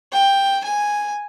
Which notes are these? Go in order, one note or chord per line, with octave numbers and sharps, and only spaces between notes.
G5
G#5